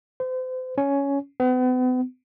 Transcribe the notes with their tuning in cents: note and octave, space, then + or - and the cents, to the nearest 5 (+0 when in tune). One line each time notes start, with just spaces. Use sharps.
C5 -35
C#4 +10
B3 +40